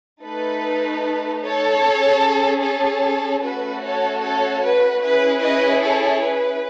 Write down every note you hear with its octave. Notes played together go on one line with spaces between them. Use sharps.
A3 D#4 A4 B4
A4 C#5
C#4
G#4
A4 C#5
A3 C#4 F#4 A4 B4
A4 C#5
A4 C#5
B4
C#4 E4 G#4 B4
B4 D#5
A4 C#5
B4